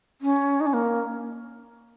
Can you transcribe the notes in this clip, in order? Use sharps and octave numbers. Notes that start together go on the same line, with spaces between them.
C#4
D#4
C#4
A#3